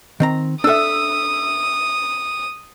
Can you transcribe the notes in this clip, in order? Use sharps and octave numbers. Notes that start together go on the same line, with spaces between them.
D#3 C4 A#5
D4 A4 E5 D#6 E6